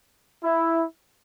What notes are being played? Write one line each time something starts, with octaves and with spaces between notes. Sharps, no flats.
E4